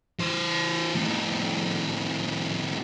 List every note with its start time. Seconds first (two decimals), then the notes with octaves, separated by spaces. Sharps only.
0.20 E3 C5
0.95 F2 A2